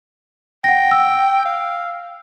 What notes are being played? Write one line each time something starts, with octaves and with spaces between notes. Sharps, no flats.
F#5 G5 A#6
E6
F5